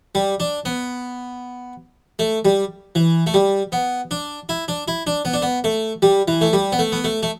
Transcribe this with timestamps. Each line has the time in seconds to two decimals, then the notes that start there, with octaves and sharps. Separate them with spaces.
0.15 G3
0.40 D4
0.65 B3
2.19 A3
2.45 G3
2.95 E3
3.27 A3
3.34 G3
3.72 B3
4.11 D4
4.49 E4
4.68 D4
4.88 E4
5.07 D4
5.25 B3
5.33 D4
5.42 B3
5.64 A3
6.02 G3
6.28 E3
6.41 A3
6.53 G3
6.72 B3
6.79 A3
6.92 B3
7.04 A3
7.23 A3